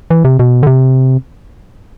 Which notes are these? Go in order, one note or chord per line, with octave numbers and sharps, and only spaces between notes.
E3
C3
B2
D3
C3